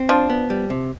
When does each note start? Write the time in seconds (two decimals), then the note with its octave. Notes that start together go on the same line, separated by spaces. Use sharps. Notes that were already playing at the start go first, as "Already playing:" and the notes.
Already playing: C4
0.09 F3 D4
0.30 B3
0.50 G3
0.70 C3